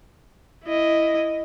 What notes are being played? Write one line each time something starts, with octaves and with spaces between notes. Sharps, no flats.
E4 D#5